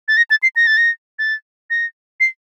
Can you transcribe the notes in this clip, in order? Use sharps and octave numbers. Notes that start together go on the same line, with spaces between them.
A6
A#6
A6
C7
A#6
A6
A#6
A6
A#6
C7